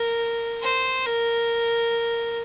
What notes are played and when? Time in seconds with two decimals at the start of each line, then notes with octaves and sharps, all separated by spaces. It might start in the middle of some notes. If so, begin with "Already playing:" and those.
Already playing: A#4
0.62 C5
1.06 A#4